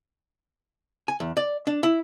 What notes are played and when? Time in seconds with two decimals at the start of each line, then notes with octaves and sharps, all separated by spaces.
1.08 G#5
1.20 E2
1.37 D5
1.67 D4
1.83 E4